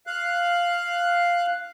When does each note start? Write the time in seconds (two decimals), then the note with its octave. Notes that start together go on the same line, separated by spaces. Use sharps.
0.07 F5 F#6